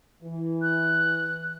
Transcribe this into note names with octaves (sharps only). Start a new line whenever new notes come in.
E3
F#6